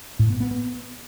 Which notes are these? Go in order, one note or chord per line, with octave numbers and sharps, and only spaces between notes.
A2
B3
B3
B3